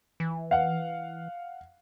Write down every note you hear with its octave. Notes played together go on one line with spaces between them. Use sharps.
E3
F5 F#5